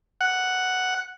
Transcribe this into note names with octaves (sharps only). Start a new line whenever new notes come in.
F#5